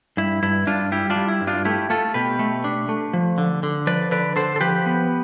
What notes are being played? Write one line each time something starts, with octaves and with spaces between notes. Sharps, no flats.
G2 E4
G2 E4
G2 D4 F4
G3 E4 G4
D4 F4
G3
E4
G2
D4 F4
A3 E4 G4
A3 F4 A4
B2 G4 B4
A3
D4
A3
F3
D3
D3
F3 B4 D5
D3 B4 D5
D3 A4 C5
A4
F3 G4 B4
B3